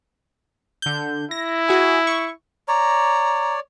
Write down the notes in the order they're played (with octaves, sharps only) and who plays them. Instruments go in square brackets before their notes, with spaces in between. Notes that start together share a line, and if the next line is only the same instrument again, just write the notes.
[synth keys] D3 G6
[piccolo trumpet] E4 [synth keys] A#6
[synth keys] F#4 G#4 G#5
C#6
[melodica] C#5 D5 [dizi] A#5